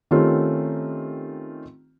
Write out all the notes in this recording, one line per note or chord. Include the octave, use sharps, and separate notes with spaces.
D#3 A3 C4 C#4 F4 G4